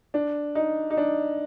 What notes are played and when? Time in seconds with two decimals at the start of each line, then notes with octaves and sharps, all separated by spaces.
0.14 D4
0.55 D#4
0.90 D#4
0.97 D4